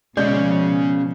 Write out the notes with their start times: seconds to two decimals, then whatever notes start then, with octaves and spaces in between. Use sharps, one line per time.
0.17 B2 F3 G#3 C#4 G#4 D5 D#5 G6